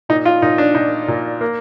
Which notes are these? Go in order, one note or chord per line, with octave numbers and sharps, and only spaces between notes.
A#2 D#4
F4
A#2 D#4
D4
A#2 D#4
A#2
A#3